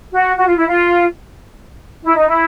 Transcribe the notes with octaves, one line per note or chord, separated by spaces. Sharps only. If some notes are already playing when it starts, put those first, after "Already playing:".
F#4
F#4
F4
E4
F4
E4
D#4
E4